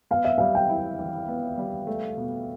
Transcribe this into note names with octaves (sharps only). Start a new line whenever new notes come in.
B3 F5
E5
G3 F5
G5
E4
E3
B3
G3
A3
B2